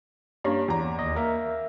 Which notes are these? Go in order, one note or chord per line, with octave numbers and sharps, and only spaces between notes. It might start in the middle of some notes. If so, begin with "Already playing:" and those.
G2 A#3 C#4
E2 A#5
D#2 D#5
A#3 A#4 E5